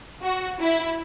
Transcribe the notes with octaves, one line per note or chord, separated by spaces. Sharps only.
F#4
E4